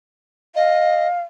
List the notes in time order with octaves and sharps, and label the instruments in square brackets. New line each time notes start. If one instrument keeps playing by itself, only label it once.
[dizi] D#5 [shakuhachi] F5